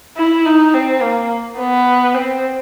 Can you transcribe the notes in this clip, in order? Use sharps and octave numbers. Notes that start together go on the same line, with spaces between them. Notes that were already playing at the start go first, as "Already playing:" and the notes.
E4
D#4
C4
A#3
B3
C4